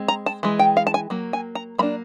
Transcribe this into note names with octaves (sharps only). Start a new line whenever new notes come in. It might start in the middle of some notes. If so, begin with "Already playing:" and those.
Already playing: G#3 C4
A#5
A5
E3 G#3
G5
F5
A5
G#5
F#3 A#3
G#5
A#5
F#3 A#3 D4 B5